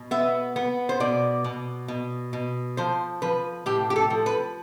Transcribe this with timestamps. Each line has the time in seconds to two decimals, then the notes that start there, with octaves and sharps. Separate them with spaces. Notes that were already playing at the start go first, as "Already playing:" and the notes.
Already playing: B2
0.11 B3 E5
0.56 B3
0.89 C5
1.00 B2 D5
1.44 B2
1.88 B2
2.33 B2
2.77 F3 C5
3.22 F3 B4
3.66 A2 G4
3.90 G4
3.96 A4
4.10 F3
4.26 B4